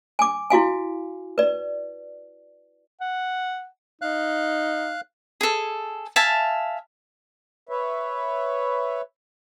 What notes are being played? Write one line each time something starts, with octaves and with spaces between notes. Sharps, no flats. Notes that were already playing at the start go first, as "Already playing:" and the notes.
G#5 D6
E4 F#4 F5 G#5
B4 D5
F#5
D#4 F5 F#6
G#4 A4
E5 F5 G#5 A5
B4 C#5 E5